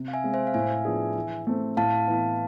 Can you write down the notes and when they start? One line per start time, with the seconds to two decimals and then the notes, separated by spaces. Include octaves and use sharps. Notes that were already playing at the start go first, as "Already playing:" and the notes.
Already playing: C3
0.08 F5
0.13 E5 G#5
0.24 G#3 C4
0.34 C5 E5
0.47 F5
0.54 A2 E5 G#5
0.85 F3 B3 D4 G#4
1.16 E3
1.47 A3 C4
1.77 A2 F5 A5
2.08 E3 B3